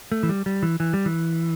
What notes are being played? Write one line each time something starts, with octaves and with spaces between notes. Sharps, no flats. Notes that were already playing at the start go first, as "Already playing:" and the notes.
A3
E3
G3
G3
E3
E3
G3
E3